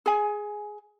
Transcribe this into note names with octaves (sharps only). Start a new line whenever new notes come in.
G#4 G#5